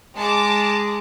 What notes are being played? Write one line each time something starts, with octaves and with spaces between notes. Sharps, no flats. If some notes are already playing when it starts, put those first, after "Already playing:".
G#3 A5 D6